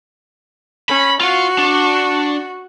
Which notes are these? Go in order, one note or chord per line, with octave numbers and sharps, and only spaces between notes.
C#4 B5
F4 F#4
D4